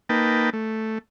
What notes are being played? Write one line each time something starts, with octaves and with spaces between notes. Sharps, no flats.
A#3 D#4 B4 G5 A5
A3